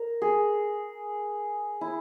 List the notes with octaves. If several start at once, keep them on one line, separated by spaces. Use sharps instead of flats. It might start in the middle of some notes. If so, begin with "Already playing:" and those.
Already playing: A#4
G#4
E4